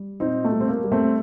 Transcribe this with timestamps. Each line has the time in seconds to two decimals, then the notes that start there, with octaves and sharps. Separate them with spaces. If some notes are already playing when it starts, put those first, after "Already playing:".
Already playing: G3
0.20 A#2 C4 D#4
0.44 A3
0.52 G3
0.61 C4
0.68 A#3
0.84 G3
0.92 A3 C4